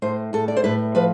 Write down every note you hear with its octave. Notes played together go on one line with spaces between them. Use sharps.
A2 C5
A2 A4
D5
C5
A2 B4
F3 B4